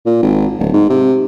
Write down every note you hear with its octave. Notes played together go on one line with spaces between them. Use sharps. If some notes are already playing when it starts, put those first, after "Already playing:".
A#2
G#1
D1
G#2
C3